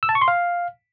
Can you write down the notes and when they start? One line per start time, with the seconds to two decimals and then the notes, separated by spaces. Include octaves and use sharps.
0.03 E6
0.09 A5
0.15 C#6
0.22 C6
0.28 F5